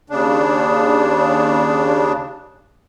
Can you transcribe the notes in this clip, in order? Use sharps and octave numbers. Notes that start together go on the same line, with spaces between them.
D#2 C#3 D4